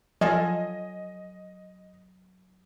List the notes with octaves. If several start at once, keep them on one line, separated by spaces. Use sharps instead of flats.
F3 F#3 F4 A4 C#5 D#5 G#5